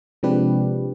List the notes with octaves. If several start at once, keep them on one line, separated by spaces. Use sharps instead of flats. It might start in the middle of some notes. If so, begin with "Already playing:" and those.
C3 F3 G#3 D4 G4 B4